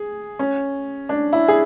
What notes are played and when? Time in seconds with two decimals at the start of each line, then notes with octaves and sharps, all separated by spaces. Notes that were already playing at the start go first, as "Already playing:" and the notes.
Already playing: G#4
0.39 C#4
1.09 D4
1.33 E4
1.48 G#4